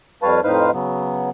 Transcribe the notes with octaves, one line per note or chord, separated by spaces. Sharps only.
F2 G3 B4 C#5 F5 A5
F2 A2 D#4 B4 C5 F5
C#3 F#3 B3